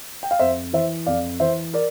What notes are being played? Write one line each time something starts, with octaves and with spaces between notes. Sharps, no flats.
G5
F5
F2 C5 E5
E3 C5 E5
F2 D5 F5
E3 C5 E5
A#4 D5